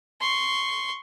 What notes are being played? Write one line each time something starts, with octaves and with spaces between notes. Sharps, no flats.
C6 C#6